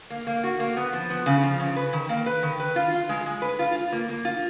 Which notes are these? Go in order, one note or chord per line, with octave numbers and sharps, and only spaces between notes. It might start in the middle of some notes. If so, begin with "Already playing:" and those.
A#3
A#3
F#4
A#3
B3
F3
B3
C#3
F3
C#3
B4
D#3
A#3
B4
D#3
B4
F4
F4
G#3
G#3
B4
F4
F4
A#3
A#3
F4